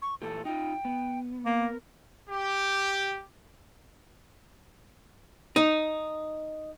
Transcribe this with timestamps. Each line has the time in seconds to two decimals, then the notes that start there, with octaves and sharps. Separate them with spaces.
0.02 C#6
0.22 A#2 E3 G4 A4
0.45 D#4 F4 G5
0.85 B3
1.46 A#3 A#4
2.30 G4
5.56 D#4